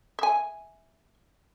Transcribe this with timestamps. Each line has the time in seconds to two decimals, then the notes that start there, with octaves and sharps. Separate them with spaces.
0.19 E5 G#5